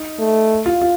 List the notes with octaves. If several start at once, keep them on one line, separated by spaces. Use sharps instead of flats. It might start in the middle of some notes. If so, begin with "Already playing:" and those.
Already playing: D#4
A3
F4
F4